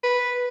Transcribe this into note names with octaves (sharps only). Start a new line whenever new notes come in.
B4